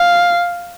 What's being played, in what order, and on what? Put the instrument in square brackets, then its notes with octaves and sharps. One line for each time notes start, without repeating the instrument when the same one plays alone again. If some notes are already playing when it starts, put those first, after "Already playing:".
Already playing: [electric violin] F5